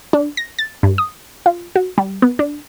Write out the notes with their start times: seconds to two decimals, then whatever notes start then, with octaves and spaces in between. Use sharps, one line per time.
0.13 D4
0.37 A#6
0.59 A6
0.83 G2
0.98 D#6
1.46 F4
1.76 F#4
1.98 G3
2.22 B3
2.39 D4